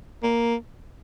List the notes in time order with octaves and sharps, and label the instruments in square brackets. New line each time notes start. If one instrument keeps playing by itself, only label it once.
[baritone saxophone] A#3